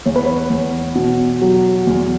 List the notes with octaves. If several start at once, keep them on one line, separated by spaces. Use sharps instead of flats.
E2 C#5
B4
C#5
E2
B2
F#3
E2